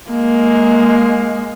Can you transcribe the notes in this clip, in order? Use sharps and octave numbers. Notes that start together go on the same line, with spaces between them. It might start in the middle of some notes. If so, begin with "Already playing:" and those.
G#3 A#3